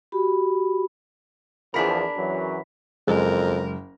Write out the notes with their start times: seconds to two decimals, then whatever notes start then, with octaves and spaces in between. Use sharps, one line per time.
0.12 F#4 G4 B5
1.74 E2 F3 D4 G#4 A#4 B5 B6
2.17 F#2 E3 F#3
3.07 F#1 F2 G#3 A#4